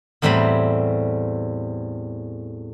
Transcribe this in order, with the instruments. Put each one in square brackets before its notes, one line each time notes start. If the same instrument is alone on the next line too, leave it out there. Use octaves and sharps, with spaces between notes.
[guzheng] E2 A2 G3 C4 A#5 B5